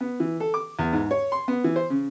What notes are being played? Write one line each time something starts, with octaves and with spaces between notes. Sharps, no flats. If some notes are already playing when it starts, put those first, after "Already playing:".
B3
E3
A4
D6
E2
G#2
C#5
C6
B3
E3
C5
C#3